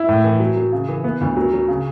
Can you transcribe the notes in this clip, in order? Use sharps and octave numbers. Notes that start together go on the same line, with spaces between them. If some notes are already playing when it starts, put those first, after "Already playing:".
Already playing: E4
A2
E3
F#3
F#3
C#3
E3
B3
D2
F#3
F#3
C#3